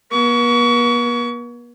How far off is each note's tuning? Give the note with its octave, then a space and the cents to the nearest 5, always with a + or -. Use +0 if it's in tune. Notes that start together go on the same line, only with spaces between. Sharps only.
B3 -45 C#6 +30